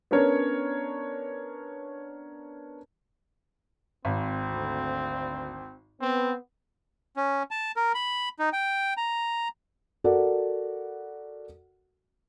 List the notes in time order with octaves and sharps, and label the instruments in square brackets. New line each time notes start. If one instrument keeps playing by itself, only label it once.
[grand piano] B3 C#4 D4 A#4 C#5
[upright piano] G#1 [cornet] C4
[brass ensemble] D2
[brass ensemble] B3 [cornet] C4
[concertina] C#4
A5
A#4
B5
D#4
G5
A#5
[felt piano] F#4 A4 A#4 D5 F#5